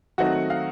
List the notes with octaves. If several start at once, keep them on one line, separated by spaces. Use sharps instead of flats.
D#3 F#3 A3 C4 D#4 F#4 F#5
F5